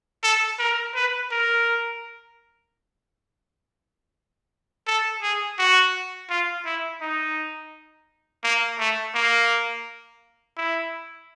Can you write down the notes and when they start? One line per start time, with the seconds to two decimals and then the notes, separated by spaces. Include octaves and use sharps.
0.23 A4
0.59 A#4
0.95 B4
1.31 A#4
4.87 A4
5.22 G#4
5.59 F#4
6.30 F4
6.65 E4
7.02 D#4
8.44 A#3
8.79 A3
9.15 A#3
10.57 E4